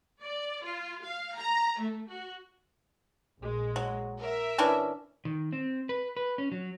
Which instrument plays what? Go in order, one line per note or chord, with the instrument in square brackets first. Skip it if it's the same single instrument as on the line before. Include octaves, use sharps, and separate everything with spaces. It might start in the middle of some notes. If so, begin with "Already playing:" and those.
[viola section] D5
F4
F5
A#5
A3
F#4
[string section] A#1 G#3
[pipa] F#3
[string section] A#4 E5
[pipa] E3 C#4 D4
[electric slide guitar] D#3
C4
B4
B4
C#4
F#3